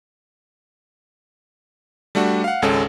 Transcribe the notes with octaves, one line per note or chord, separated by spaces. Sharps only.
G3 A3 D4 F#4
F5 F#5
G#1 C#2 G#3 C#4 A4